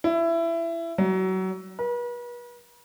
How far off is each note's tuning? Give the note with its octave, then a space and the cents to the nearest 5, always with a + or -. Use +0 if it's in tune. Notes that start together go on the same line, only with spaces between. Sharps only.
E4 +20
F#3 +25
B4 -40